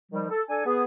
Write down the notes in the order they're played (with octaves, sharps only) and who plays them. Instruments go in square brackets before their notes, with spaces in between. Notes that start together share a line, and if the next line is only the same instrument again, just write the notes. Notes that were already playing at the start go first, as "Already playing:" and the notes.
[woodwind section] D#3 F3 G3
A4
D4 A4 G#5
B3 G#4